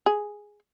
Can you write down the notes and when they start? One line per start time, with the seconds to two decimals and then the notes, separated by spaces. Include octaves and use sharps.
0.06 G#4